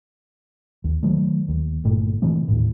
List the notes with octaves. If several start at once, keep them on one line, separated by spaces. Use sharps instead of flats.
D#2
D#3 F#3 A3
D#2
G1 G2 A#2 A3
C3 E3 A3 C4
D#2 A2